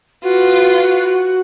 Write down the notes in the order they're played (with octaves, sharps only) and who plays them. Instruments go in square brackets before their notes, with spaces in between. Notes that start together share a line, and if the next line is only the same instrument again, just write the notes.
[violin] F4 B4 [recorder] F#4